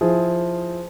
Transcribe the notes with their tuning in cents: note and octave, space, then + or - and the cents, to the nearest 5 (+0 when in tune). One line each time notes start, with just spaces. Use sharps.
F3 +0 E4 +0 G#4 +0